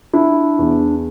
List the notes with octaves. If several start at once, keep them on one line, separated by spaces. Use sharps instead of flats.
D4 E4
E2